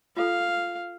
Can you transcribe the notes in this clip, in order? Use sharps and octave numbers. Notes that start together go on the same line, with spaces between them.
F4 A4 F5